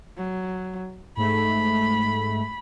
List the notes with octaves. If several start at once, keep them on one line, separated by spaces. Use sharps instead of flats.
F#3
G#2 A3 B5